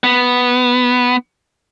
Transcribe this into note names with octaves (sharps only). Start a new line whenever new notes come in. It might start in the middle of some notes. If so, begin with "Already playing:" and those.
B3